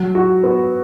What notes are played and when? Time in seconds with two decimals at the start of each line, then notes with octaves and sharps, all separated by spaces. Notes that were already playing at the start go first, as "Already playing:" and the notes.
Already playing: F#3
0.15 F#4
0.44 B3